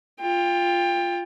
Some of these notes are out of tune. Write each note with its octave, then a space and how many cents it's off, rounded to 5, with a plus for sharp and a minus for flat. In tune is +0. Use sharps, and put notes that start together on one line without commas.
F4 +0 G5 +25